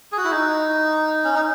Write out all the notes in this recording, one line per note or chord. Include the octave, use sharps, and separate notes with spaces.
G#4
F#4
E4
D#4
C#4
D#4